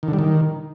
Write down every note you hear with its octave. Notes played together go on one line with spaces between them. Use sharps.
D#3
D3
G3
D#3